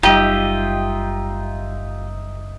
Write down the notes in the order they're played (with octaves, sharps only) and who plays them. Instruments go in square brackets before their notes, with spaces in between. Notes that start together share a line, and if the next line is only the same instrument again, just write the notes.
[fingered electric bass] F#1 G3 [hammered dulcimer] D#4 E5 [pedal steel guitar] F4 D#5 [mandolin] G4